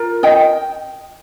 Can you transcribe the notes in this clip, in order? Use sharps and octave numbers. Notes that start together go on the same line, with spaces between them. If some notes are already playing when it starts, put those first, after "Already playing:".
Already playing: F4 A#4
D#5 G5